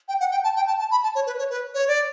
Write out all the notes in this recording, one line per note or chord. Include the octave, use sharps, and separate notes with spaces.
G5
F#5
G5
A5
G5
A5
A5
B5
A5
C#5
B4
C#5
B4
C#5
D5